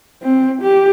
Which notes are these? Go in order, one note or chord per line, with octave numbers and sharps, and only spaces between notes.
C4
G4